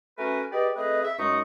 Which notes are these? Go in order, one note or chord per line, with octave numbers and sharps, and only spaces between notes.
A3 C#4 F#4 A#4 B4 G#5
G4 G#4 B4 D5 D#5
A3 C4 G#4 B4 D#5
E5
F#2 G#3 D#4 D#5 C#6 D#6